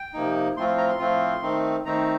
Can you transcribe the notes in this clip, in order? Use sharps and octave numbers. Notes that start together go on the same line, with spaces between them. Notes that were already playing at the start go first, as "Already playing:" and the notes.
Already playing: G5
C3 F3 A#3 D#4
A2 F3 A3 C4 F4 C6
C6
A#5
C6
A2 F3 A3 C4 F4
D#3 A3 C4 D#4
D#3 A3 C4 D#4 A#5